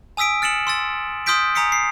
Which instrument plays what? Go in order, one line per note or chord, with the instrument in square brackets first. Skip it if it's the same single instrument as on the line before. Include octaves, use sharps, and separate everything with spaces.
[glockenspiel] G#5 D#6 E6 B6 D7
F6 A6 C#7 E7 F#7
C6 E6 A6
C6 D#6 F6 G6 B6 D7
G#5 A#5 D#6 B6 C#7
C7